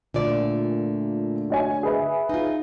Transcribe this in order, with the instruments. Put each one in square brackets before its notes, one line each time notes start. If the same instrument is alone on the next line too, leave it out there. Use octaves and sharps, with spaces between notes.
[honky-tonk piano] A#2 [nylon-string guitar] D3 A3 D5
[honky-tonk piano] F#4 C#5 G#5
G#4 B4 E5
[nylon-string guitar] D#4 F4